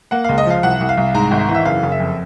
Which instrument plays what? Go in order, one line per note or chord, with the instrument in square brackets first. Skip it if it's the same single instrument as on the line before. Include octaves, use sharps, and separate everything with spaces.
[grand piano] A#3 F#5
C#2 F5
D#5
F3 F5
C2 F#5
C2
F5
C2
G#2 A#5
G#1
E3
E5
F#1 F5
F#1
E5
F2